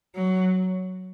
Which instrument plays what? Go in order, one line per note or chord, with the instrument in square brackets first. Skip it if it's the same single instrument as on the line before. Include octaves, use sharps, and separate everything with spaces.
[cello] F#3